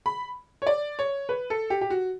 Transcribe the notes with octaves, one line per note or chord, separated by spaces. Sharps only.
B5
C#5
D5
C#5
B4
A4
G4
G4
F#4